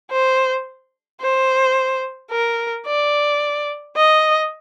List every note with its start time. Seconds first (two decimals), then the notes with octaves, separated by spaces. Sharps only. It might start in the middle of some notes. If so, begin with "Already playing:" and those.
0.11 C5
1.21 C5
2.31 A#4
2.87 D5
3.96 D#5